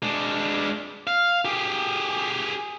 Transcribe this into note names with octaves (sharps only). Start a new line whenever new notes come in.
G#3 D4
F5
G4 G#4